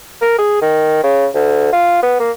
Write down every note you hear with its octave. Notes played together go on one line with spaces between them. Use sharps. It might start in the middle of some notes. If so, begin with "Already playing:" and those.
A#4
G#4
D#3
C#3
D2
F4
B3
A#3